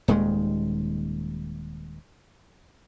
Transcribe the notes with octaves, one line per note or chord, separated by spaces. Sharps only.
D#1 D#2 D#3 G#3